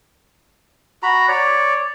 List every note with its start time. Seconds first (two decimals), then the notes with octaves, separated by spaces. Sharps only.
1.03 F#4 A#5 B5
1.28 C#5 D5